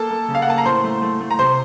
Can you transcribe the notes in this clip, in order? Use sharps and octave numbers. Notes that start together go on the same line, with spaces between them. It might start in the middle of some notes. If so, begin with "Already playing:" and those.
Already playing: A#3 A4 A5
A#3
C#3
F5
F#5
A#3 A5
A#5
A2 C5 C6
A3
A3
A3
A#5
C3 C5 C6